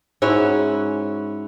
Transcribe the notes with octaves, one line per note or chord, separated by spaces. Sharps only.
G#2 C#4 E4 F#4